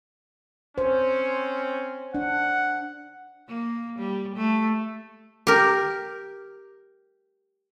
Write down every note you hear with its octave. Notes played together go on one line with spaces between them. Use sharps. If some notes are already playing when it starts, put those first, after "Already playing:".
C4 C#4 C5
D4 F#5
A#3
G3
A3
G4 A#4